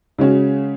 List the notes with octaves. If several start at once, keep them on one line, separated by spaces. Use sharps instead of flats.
C#3 G#3 C#4 F#4